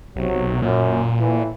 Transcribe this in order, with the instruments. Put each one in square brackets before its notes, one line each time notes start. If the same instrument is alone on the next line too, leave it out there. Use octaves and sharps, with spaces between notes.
[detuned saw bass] B1 [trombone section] C3 F#3
[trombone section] F#2 [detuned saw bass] A#2
[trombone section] A2 E3